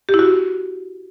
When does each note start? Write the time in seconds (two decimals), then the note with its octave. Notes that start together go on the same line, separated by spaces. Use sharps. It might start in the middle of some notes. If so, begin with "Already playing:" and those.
0.09 G4
0.14 E4
0.19 F#4